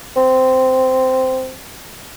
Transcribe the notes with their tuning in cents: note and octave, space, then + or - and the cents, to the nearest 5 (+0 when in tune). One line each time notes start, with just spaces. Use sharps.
C4 -10